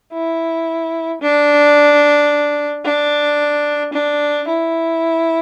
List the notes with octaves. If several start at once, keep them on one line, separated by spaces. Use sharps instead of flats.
E4
D4
D4
D4
E4